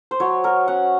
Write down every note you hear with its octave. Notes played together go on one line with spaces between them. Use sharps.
C5
F#3 C#5
F#3 A#4
C#4 F#5